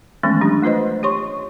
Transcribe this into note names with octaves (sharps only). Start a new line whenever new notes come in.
D#3 E3 G#3 A3 B3 C#4
F#3 D4 G4
A3 F4 B4 C5 D#5
G4 C#5 C6 C#6